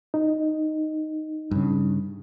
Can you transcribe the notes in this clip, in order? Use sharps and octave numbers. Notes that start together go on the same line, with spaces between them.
D#4
G2 C#3